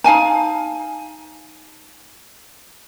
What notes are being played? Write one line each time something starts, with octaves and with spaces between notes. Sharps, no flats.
D#4 F5 G#5 A5